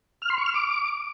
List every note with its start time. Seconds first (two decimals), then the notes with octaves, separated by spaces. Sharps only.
0.22 F6
0.30 C6
0.38 C#6
0.46 F6
0.54 D6